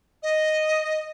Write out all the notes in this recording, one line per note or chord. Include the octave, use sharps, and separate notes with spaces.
D#5